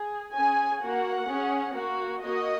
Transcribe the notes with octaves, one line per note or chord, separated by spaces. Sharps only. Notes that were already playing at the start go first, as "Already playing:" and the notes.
Already playing: G#4
C#4 G#4 G#5
A#3 F#4 F#5
C#4 G#4
A#3 F#4
A#3 F#4 D#5